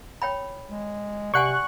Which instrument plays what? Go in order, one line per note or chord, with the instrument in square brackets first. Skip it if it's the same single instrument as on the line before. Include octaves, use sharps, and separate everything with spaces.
[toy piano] C#5 G5 B5
[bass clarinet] G#3
[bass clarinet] C3 [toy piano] D5 F#5 G#5 [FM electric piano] C#6 F#6